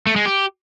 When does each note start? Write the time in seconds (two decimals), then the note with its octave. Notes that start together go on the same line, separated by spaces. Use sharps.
0.07 A3
0.16 G#3
0.25 G4